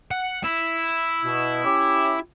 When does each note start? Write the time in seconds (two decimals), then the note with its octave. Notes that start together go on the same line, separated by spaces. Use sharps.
0.11 F#5
0.44 E4
1.24 B2
1.64 C#4 G4